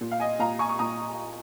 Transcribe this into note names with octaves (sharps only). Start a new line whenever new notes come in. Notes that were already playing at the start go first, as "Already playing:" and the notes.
A#2
F5
D#5 G#5
A#2 F5 A#5
G#5 C#6
C#6
A#2 A#5 D#6